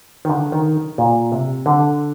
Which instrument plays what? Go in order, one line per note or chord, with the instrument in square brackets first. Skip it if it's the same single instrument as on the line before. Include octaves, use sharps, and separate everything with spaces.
[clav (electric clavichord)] D#3
D3
D#3
A#2
C3
D3